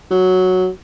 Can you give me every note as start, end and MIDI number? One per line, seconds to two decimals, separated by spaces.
0.11 0.68 54